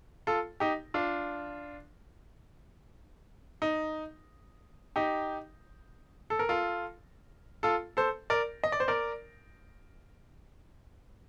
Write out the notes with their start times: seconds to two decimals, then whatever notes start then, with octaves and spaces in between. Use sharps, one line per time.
0.27 F4 A4
0.60 D#4 G4
0.94 D4 F4
3.62 D#4
4.96 D#4 G4
6.30 A4
6.39 A#4
6.49 F4 A4
7.63 F4 A4
7.97 A4 C5
8.30 A#4 D5
8.64 D#5
8.72 D5
8.80 C5
8.88 A#4 D5